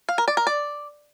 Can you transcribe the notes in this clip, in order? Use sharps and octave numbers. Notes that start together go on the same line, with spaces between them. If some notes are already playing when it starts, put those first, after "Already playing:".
F5
A#4
D5
A#4
D5